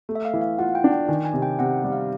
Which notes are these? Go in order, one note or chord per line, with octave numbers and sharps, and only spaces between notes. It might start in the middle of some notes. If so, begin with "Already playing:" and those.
A3
E5
F5
E3
F5
F4 F#5
G5
D4
G5
D#3 G#5
G#5
C3
G5
C3 F#5
G3
F5